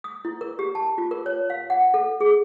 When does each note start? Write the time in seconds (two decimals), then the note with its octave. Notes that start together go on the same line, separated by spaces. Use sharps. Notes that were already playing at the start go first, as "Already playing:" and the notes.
0.04 D#6
0.25 E4
0.41 A#4
0.59 G4
0.75 A5
0.98 F4
1.11 A#4
1.26 C#5
1.50 F5
1.70 F#5
1.94 A4
2.21 G#4